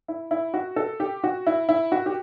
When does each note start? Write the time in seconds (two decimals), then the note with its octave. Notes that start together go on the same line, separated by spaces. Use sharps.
0.08 E4
0.31 E4
0.54 F#4
0.76 A4
1.00 G4
1.24 F#4
1.47 E4
1.69 E4
1.92 F#4
2.06 G4